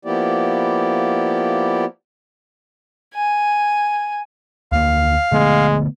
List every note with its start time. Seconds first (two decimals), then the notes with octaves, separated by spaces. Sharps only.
0.05 F3 A#3 B3 E4 G4 D5
3.14 G#5
4.72 D2 A#3 F5
5.32 D3 G#3 A3 B3